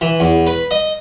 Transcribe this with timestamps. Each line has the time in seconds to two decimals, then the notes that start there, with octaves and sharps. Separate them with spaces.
0.01 E3
0.20 E2
0.47 B4
0.71 D#5